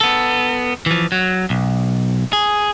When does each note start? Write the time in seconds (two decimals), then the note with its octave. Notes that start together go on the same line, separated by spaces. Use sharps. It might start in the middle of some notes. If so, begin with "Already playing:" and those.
0.01 B3 A4
0.86 E3 F3
1.12 F#3
1.50 B1
2.33 G#4